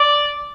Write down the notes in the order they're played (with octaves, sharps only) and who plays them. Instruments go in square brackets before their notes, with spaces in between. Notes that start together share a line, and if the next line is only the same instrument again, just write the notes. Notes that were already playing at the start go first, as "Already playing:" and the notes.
Already playing: [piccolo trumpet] D5